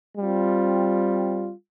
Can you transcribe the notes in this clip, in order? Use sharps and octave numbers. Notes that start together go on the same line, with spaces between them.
G3 C4 F4